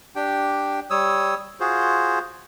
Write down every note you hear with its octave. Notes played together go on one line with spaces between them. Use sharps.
D4 G4 G5
G3 C#5 D#6 E6
F4 F#4 G#4 C5